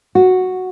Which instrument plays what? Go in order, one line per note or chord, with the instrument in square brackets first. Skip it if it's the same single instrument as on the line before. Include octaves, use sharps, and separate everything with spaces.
[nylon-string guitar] F#4